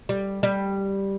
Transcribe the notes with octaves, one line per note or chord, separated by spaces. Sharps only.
G3
G3